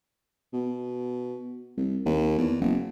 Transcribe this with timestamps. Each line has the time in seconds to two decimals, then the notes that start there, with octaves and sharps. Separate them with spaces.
0.53 B2
1.77 C2
2.05 D#2
2.38 E2
2.61 F#1